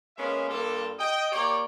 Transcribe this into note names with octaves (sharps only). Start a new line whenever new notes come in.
G#3 A#3 B3 C#4 E5 F5
G2 A#3 F4 A4
D#5 G5
A#3 G4 C#5 D5